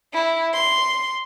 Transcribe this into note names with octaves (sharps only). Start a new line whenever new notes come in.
E4
C6